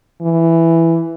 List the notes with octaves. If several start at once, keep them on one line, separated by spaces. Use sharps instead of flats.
E3